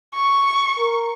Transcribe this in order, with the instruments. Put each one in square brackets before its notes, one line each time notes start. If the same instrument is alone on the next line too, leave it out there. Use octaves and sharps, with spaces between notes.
[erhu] C#6
[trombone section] A#4